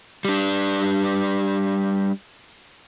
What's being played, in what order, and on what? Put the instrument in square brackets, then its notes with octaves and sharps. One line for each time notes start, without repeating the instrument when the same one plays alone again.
[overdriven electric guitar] G3 D4